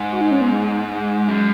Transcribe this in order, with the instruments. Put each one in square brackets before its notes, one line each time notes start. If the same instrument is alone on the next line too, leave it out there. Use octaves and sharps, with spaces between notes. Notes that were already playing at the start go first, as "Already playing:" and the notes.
Already playing: [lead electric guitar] G#2
[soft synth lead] F#4
D#4
C#4
B3
G#3
[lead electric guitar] F#2